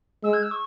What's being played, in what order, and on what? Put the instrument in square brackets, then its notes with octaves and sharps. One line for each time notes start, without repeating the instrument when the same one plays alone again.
[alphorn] G#3 [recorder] E6
[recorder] G#6
E6
C#6